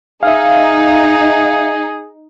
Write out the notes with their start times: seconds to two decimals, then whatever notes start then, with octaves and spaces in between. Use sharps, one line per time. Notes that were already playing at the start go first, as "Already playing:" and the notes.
0.23 D#4 G#4 E5 F5